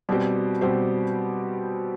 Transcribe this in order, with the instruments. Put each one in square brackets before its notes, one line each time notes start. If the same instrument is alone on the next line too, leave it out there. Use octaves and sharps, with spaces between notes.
[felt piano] B2 G3 C4 G4 C5
B2 G3 C4 G4 C5